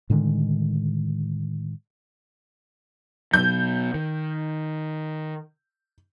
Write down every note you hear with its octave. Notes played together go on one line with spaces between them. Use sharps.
A2 D3 D#3 G#3
B2 F#3 G6
D#3